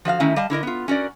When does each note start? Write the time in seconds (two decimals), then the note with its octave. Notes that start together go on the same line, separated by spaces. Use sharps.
0.05 F3 F#4 E5 F5
0.20 D#3 A3 C#4 D#4 E4
0.36 G3 D#5 F5 A5
0.50 D3 E4 A#4 D#5
0.63 B3 F4
0.88 C#4 F#4 A#4 D5